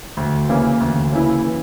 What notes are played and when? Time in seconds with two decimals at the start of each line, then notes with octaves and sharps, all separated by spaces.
0.17 D2
0.49 C#3 E3 A#3 E4
0.80 D2
1.12 C#3 E3 A#3 E4
1.45 E3